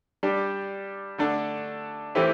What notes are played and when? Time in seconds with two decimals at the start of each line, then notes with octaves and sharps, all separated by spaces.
0.23 G3 D4 G4
1.18 D3 A3 D4 A4
2.15 E3 A3 C4 E4 G4